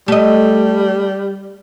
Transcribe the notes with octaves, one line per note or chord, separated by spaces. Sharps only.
G3 A3 D#5